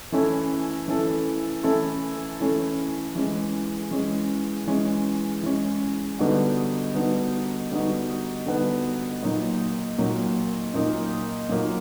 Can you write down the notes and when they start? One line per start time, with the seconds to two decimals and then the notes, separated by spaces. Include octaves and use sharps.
0.12 E3 A3 C#4 E4 A4
0.88 E3 A3 C#4 E4 A4
1.64 E3 A3 C#4 E4 A4
2.40 E3 A3 C#4 E4 A4
3.15 E3 G#3 C#4
3.91 E3 G#3 C#4
4.67 E3 G#3 C#4
5.43 E3 G#3 C#4
6.19 D3 G3 B3 D#4 F#4
6.94 D3 G3 B3 D#4 F#4
7.71 D3 G3 B3 D#4 F#4
8.46 D3 G3 B3 D#4 F#4
9.22 A#2 F#3 A#3 D#4
9.98 A#2 F#3 A#3 D#4
10.74 A#2 F#3 A#3 D#4
11.49 A#2 F#3 A#3 D#4